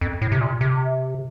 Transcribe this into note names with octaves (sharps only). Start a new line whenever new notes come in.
F2
A2
C3
A#2
C3